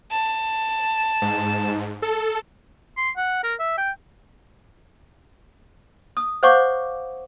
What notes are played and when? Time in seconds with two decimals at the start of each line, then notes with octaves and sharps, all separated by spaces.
0.11 A5
1.22 G#2
2.02 A4
2.97 C6
3.17 F#5
3.43 A#4
3.60 E5
3.78 G5
6.17 D#6
6.43 C5 C#5 F5 F#5 C#6 D6